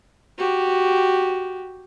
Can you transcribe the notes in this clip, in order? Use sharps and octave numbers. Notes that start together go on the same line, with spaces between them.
F#4 G4